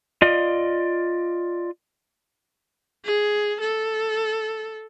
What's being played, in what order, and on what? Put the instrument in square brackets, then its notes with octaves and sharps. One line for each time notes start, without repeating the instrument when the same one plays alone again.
[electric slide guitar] F4 D5 D#5
[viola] G#4
A4